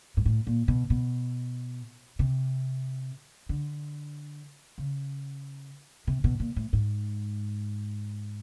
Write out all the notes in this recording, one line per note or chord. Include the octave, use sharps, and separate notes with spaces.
G#2
A2
A#2
B2
B2
C3
D3
C#3
C3
B2
A#2
A2
G#2